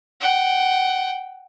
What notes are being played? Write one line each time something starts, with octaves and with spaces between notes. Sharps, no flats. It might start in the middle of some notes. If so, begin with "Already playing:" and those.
F#5 G5